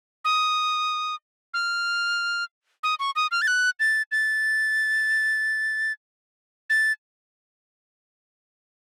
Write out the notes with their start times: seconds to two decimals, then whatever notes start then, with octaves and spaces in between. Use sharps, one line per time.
0.25 D#6
1.54 F6
2.83 D#6
2.99 C#6
3.16 D#6
3.31 F6
3.42 A6
3.47 F#6
3.80 A6
4.12 A6
6.70 A6